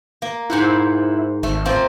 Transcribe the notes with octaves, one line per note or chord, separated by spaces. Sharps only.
A#3
G#2 E4 C5 F#5
G#1 A3
F3 A#3 C4